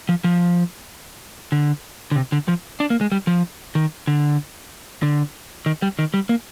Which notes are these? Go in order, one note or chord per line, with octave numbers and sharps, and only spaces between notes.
F3
F3
D3
D3
C3
D3
F3
D4
A#3
G#3
G3
F3
D#3
D3
D3
D#3
G3
D#3
G3
A#3